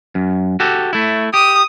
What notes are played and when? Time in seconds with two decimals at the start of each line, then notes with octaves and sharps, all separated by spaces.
0.15 F#2
0.60 F#4 G4 A4
0.93 A3 E4
1.34 G4 D#6